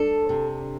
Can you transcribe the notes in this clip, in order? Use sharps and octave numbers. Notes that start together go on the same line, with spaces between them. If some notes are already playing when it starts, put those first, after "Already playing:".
Already playing: D4 A4
C3